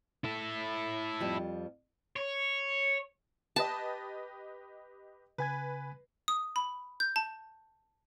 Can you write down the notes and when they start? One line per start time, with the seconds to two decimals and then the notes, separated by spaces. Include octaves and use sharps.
0.24 E4 A4
1.20 F2 F3 G3
2.16 C#5
3.56 G4 B4 D#5 A5
5.38 C#3 B4 G#5 G#6
6.28 D#6
6.56 B5
7.00 G6
7.16 A5